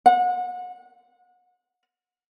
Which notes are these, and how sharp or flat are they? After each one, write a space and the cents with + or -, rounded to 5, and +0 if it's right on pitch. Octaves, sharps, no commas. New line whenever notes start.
F#5 -30